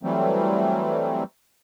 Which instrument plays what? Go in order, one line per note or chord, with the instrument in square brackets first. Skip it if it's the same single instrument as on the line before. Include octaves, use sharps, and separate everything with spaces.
[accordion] E3 F#3 G3 A3 C4